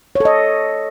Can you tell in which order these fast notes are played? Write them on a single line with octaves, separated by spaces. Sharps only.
C#5 A4 D#5